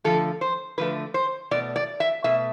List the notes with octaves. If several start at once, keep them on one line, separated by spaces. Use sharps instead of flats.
D3 F3 A3 A4
C5
D3 F3 A3 B4
C5
B2 A3 D5
D5
E5
B2 A3 E5